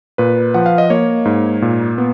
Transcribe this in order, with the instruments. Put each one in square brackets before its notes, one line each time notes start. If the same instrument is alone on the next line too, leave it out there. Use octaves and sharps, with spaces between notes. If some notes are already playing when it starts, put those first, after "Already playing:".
[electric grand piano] A#2 B4
F3 F#5
F5
D#5
A#3 C#5
G#2
A#2
B3